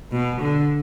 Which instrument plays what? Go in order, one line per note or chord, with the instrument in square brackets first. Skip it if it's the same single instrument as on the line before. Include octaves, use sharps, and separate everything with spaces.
[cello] B2
D3